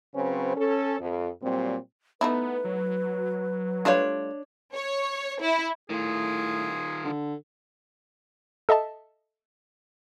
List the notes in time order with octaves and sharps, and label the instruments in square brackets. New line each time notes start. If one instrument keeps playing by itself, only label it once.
[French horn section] C#3 F#3 C4 C#4 B4 C5
C#4 A4
F2
A#2 F#3 G3 C4
[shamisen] A3 D#4 E4 [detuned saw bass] B3 [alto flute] B4
[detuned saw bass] F#3
[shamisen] G3 A3 F4 [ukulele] D4 C#5
[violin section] C#5
E4
[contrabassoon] A2 [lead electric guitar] D#3 F4 [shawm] G#4
[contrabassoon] D3
[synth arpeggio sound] A4 D#5 E5 A5